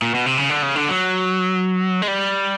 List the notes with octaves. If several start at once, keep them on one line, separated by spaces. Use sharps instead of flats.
A#2
B2
C3
C#3
D3
C#3
D3
F#3
G#3
G3